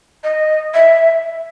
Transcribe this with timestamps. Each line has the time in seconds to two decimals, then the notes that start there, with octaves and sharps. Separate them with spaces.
0.24 D#5
0.74 E5